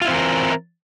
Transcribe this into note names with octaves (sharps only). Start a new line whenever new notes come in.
E3 C4 E4 F4 A#4